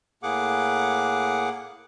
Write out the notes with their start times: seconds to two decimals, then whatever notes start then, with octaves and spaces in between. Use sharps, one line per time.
0.23 A2 A#3 G#4 F#5 D6